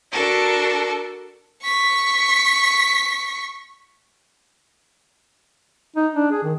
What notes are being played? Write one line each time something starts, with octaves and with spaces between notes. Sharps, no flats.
D4 F#4 A4 A#4
C#6 B6
D#4
D4
G#4
D#3